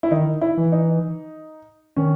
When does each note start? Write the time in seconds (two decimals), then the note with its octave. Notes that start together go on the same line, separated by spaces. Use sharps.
0.03 E4
0.11 D#3 D#4
0.41 E4
0.57 E3
0.72 D#4
1.96 D#3 C#4